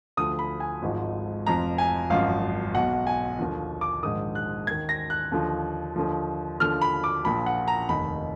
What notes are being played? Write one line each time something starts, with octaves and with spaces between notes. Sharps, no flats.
D2 D3 F3 D#6
B5
G#5
G#1 G#2 F3
F1 F2 F3 A#5
G#5
G#1 F#2 F3 F5
B1 B2 F#5
G#5
D#2 D3 F3
D6
A#1 G#2 D#3 D#6
F#6
D#2 D#3 G#6
A#6
F#6
D#2 D3 F3
D#2 D3 F3
D#2 D3 F3 F6
B5
D6
A#1 A#2 F3 B5
F#5
A#5
F1 D#2 D#3 B5